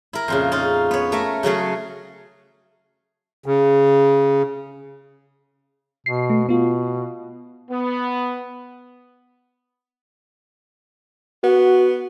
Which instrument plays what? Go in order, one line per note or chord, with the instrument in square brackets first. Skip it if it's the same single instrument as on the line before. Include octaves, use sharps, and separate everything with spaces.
[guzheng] E4 A#4
F2 A#2 C#3
C#4 D#4 F4
B3 C#5
A3 A#4 E5
C#3 F#3 A3 G#4
[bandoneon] C#3
[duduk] B2 [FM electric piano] C7
[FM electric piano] A3
[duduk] B2 [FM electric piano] B3 F4
[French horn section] B3
[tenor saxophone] B3 [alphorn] F#4